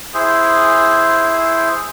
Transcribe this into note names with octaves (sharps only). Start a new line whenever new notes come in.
E4 G#4 C5